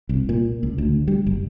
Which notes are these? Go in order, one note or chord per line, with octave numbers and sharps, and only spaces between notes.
C2
A#2
C#2
D2
G3
F#1